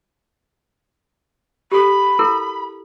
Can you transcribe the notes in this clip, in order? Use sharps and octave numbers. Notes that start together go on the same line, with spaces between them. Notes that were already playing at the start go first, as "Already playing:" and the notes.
G4 A4 B5
E4 A4 A#4